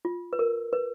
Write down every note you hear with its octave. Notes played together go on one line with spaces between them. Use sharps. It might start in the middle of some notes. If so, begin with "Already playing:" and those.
F4
B4
A#4
B4